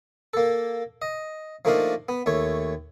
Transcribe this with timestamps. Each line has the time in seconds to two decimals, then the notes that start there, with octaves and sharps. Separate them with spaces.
0.34 A#3 A4
1.02 D#5
1.65 F3 A3 A#3 D4 D#4 F5
2.09 B3
2.26 D#2 A3 C#5